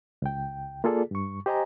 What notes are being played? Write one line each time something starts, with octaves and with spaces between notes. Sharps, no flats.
C#2 G5
A#3 F4 G#4 A4 D5
G2 C#6
G4 C5 D#5 G#5 A#5